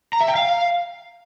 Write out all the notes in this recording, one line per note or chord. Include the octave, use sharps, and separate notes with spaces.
A#5
E5
G5
F5